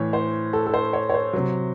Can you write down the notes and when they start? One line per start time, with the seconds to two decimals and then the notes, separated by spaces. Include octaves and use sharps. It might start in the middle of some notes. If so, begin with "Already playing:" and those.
Already playing: A2 E3 C#5
0.13 C5
0.53 A4
0.67 A4
0.74 C5
0.93 C#5
1.10 C#5
1.14 C5
1.33 C3 F#3